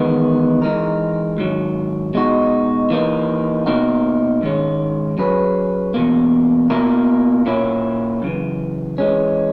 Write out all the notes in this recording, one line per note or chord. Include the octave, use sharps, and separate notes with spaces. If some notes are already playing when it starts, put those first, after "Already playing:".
Already playing: E2 D#3 G#3 B3
E3 G#3 D#4 A#4
G#2 D#3 F#3
B2 G#3 D#4 F#4
E3 A#3 D#4
B2 A#3 D#4 F#4 A#4
G#2 D#3 G#3 C#4
F#3 C#4 G#4 B4
E2 B2 A#3
B2 A#3 E4 A#4
A#2 A#3 C#4 E4
F#2 C#3 E3
E3 G#3 C#4